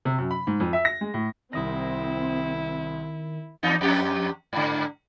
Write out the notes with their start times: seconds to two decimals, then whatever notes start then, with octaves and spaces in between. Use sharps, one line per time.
0.05 C3
0.18 F#2
0.31 B5
0.47 G#2
0.60 F2
0.73 E5
0.85 A#6
1.01 G#3
1.14 A2
1.53 C2 D#3 C4 E4 D#6 A#6
3.63 E2 D#4
3.81 F2 G4
4.53 G#2 D3